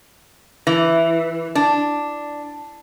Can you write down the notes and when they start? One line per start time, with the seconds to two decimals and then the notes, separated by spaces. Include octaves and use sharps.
0.67 E3
1.55 D4